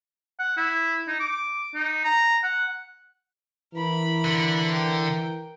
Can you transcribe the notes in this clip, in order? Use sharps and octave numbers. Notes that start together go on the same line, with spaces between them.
F#5
E4
D#4
D6
D#4
A#5
F#5
E3 A#4 B5
D3
A#4 G5